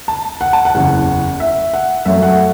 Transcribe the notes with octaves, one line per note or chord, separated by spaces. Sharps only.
A5
F#5
A5
F#5
F#1 E2 C#3
E5
F#5
F#2 F#3 A3 C#4 E5
F#5